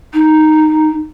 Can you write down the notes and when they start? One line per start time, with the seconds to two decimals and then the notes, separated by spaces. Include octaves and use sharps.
0.14 D#4